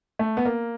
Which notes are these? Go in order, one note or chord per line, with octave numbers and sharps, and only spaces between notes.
A3
B3
A#3